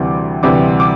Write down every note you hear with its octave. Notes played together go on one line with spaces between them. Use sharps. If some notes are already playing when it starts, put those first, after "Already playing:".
Already playing: D2 C3 E3 G3 D6
D2 C3 E3 G3 D6
D6